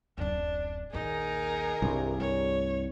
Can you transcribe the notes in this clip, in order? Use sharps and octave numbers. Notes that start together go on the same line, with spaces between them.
D1 F#2 D4
A#1 D#2 D#4 G#4 A#4
C2 G2
A3 C#5